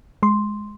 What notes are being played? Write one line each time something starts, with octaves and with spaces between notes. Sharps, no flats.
G#3 C6